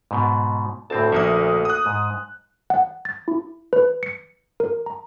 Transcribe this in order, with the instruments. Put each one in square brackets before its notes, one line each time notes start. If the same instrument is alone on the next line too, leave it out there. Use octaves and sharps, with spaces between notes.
[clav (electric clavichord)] G#2 B2
[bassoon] D2 [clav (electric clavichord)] A2 C4 A5
[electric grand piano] A#1 D#6 [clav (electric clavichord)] A#3 D#4 E5
[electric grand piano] D#6 F#6
[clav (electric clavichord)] G#2
[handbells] F#5
A6
E4
B4
C#7
A#4
A#5